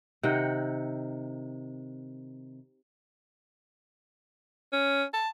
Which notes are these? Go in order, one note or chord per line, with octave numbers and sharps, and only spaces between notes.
C3 D#3 F#5 G5
C#4
A5